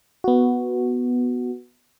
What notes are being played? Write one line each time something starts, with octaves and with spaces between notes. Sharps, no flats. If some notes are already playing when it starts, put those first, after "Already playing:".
B3 F#4